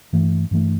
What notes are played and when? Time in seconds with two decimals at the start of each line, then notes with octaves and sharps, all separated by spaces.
0.13 G2 E3 A3
0.51 G2 E3 A3